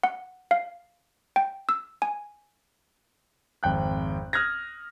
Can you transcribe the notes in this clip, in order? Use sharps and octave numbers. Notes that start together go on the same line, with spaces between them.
F#5
F5
G5
E6
G#5
G#1 F2 G5 F#6
D#6 F6 F#6 G#6 A#6